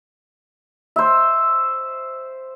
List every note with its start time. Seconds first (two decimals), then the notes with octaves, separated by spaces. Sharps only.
0.96 C5 E5